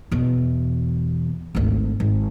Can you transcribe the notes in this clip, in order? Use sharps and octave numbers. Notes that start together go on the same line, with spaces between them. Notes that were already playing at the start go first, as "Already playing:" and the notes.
E2 B2
G#1 D2
G#1